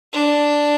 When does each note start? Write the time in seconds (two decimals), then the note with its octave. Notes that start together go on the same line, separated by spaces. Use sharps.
0.13 D4